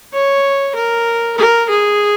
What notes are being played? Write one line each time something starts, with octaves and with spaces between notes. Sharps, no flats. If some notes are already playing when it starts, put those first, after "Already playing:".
C#5
A#4
A#4
G#4